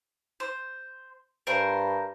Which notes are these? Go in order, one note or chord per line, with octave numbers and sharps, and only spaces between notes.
C5
G2 A#4 C5